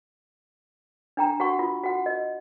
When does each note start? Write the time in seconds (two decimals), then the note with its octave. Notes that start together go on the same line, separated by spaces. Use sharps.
1.17 D4 G5 A#5
1.40 F#4 F#5 C#6
1.59 F4
1.83 F#4 F#5
2.06 D#5